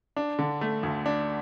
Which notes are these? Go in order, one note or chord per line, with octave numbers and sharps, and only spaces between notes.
D4
D3
A3
D2
D4